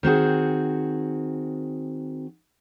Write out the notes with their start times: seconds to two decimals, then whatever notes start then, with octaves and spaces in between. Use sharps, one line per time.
0.03 D#3 C4 F#4 G#4